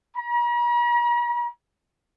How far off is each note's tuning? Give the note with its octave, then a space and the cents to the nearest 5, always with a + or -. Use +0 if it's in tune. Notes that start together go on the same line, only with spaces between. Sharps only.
A#5 +45